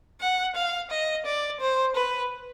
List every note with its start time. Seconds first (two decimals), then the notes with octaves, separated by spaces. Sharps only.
0.21 F#5
0.55 F5
0.91 D#5
1.25 D5
1.61 C5
1.95 B4